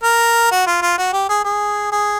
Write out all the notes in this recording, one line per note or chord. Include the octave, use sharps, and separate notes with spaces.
A#4
F#4
F4
F4
F#4
G4
G#4
G#4
G#4